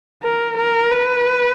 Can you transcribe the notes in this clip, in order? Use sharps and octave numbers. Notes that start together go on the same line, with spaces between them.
A#4
A#4
B4